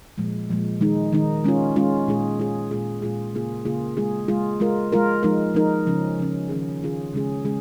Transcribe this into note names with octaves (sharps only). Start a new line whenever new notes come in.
A#2 F3 G#3
A#2 F3 G#3
D#3 G#3 D#4
D#3 G#3 D#4
G#3 C#4 F4
G#3 C#4 F4
A#2 G#3 F4 G#4
A#2 G#3 F4 G#4
A#2 G#3 F4 G#4
A#2 G#3 F4 G#4
C#3 A#3 F4 G#4
C#3 A#3 F4 G#4
G#3 F4 G#4
G#3 F4 G#4
G#3 F4 A#4
G#3 F4 A#4
F3 G#3 D#4 A#4
F3 G#3 D#4 A#4
C#3 F3 C#4
C#3 F3 C#4
D#3 C#4 F4 G#4
D#3 C#4 F4 G#4
C#3 G#3 C#4 G#4
C#3 G#3 C#4 G#4